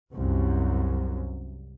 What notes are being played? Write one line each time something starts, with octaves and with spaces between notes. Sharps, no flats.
C2 F#2